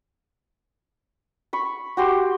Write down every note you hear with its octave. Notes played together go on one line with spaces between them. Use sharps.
B5 C#6
F#4 G4 C6